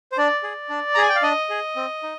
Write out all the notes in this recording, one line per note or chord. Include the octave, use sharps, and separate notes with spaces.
C5
D4 D5
G#4
D4
G#4 A#5
G#5
G5
F5
D4 D#5
G#4
C4
D#4